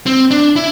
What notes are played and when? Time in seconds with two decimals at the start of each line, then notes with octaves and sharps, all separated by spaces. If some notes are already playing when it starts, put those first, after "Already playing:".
0.06 C4
0.31 D4
0.56 E4